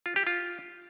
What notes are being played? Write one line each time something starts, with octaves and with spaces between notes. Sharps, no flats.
F4
G4
F4